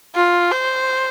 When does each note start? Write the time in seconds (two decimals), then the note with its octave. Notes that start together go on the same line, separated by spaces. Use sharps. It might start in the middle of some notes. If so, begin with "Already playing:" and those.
0.15 F4
0.51 C5